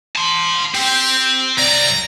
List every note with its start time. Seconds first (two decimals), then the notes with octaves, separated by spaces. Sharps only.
0.16 A5 C6
0.74 C4 G4
1.58 C2 D5 A#5